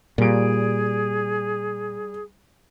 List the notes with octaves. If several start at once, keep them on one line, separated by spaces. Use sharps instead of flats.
A#2 G3 G#4 D7